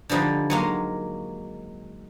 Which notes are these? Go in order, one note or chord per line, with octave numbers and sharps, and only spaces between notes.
D3 F3 G3 D#4 C5
F#3 G#3 A#3